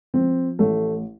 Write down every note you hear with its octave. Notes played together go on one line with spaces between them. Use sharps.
F3 C4
A1 A3